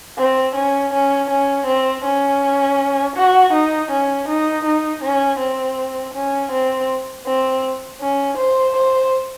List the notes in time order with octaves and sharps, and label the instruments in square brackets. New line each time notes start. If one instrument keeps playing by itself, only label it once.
[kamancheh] C4
C#4
C#4
C#4
C4
C#4
F#4
D#4
C#4
D#4
D#4
C#4
C4
C#4
C4
C4
C#4
C5
C5